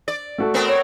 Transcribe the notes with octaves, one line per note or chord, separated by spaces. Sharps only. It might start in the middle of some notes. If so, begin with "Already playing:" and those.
D5
A3 F#4 A4
B3 C4 A#4
C#5